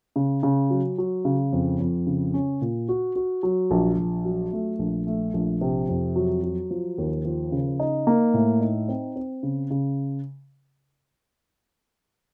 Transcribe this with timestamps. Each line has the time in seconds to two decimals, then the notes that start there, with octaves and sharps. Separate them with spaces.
0.16 C#3
0.43 C#3
0.70 F#3
0.98 F#3
1.25 C#3
1.53 F2
1.80 F2
2.06 C#3
2.34 C#4
2.61 A#2
2.89 F#4
3.16 F#4
3.43 F#3
3.71 A#1
3.98 A#1
4.25 F#3
4.53 A3
4.79 A#1
5.07 A3
5.34 A#1
5.61 C3
5.89 F2
6.16 F#3
6.43 F#3
6.70 F3
6.98 D#2
7.25 F3
7.52 C#3
7.80 D#4
8.07 A#3
8.34 A2
8.61 D#4
8.88 C4
9.16 C4
9.43 C#3
9.71 C#3